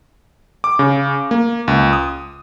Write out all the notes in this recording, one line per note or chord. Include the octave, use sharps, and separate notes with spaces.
D6
C#3
A#3
C#2
D#6